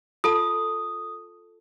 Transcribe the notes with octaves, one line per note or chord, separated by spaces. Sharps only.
F4 A4 A5 D#6